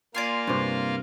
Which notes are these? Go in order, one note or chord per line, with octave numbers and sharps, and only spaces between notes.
A#3 F4 D5 F5 G#5 C6
G2 C3